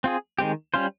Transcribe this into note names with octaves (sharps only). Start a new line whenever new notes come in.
C4 F4 G#4
D#3 G#3 C4 G4
G3 C#4 F4 C5